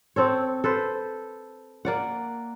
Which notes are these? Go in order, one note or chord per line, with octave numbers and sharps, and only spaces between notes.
C4 A4 C#5
A4 B4 C5
A#3 D5 F#5